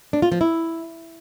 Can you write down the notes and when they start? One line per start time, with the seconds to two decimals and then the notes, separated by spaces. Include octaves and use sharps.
0.13 D4
0.22 F4
0.32 F3
0.41 E4